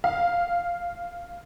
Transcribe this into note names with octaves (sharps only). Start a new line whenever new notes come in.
F5